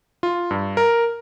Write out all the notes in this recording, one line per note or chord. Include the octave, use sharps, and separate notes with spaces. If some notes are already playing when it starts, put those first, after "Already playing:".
F4
G2
A#4